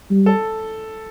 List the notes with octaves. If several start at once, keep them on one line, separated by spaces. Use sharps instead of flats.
G3
A4